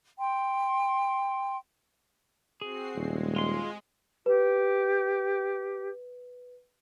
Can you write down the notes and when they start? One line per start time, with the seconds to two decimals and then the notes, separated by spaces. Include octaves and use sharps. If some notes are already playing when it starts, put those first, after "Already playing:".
0.19 G5 C6
2.61 C4 F#4 G#4 C7
2.96 D#1 G#3
3.36 F4 C6
4.26 G4 B4